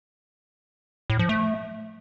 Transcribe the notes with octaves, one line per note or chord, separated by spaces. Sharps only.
A2
F3
A3